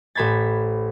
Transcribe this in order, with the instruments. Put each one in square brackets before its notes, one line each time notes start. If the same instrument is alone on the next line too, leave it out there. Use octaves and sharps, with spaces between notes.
[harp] A1 C5 B5 G#6 A6